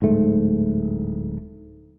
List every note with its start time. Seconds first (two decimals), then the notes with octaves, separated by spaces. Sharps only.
0.02 D1 G#2 A3